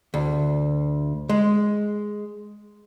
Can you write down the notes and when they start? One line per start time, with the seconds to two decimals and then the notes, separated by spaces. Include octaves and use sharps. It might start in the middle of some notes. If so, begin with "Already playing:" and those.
0.14 D2
1.29 G#3